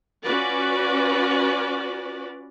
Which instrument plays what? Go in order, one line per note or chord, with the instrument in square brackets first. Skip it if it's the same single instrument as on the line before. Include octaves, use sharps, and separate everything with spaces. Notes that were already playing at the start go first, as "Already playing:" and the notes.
[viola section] C#4 F4 F#4 B4 D5